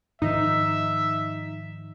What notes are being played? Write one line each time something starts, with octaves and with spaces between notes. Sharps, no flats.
G#2 D#3 F3 D#4 E5